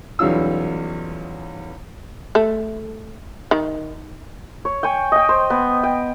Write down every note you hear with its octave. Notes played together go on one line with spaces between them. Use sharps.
B1 E2 G3 C#4 F4 E6
A3
D#3
C#5
G5 G#5 C#6
D#5 G5
C5
B3
G5